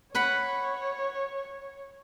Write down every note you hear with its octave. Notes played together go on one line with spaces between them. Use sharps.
B4 C#5 F#5 B5